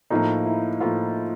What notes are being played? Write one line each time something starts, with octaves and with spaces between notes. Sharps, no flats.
A2 F3 A#3 D#4
E4
A2 F3 A#3 F4